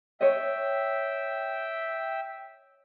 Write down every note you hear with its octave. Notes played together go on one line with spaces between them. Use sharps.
C#5 D#5 E5 G5